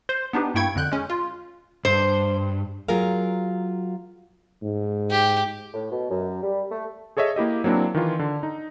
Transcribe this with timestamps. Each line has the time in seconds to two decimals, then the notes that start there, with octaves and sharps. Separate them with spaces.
0.09 C5 C6
0.33 B3 D4 D#4 G4 B4
0.54 G2 A#3 E4 G5 C#6 G#6
0.76 F2 D3 F#6 G6
0.92 G#3 C#4
1.10 F4
1.85 G2 C5
2.88 F#3 F4 G#4 A#4 F5
4.62 G#2
5.10 G4
5.74 A2
5.92 B2
6.10 F#2
6.43 G3
6.71 A3
7.17 G#4 A4 C#5 D#5 E5
7.36 A#3 E4 G4 D#5
7.64 F#3 A#3 C4 D4 E4
7.95 D#3 E3 F4
8.19 D3
8.43 D#4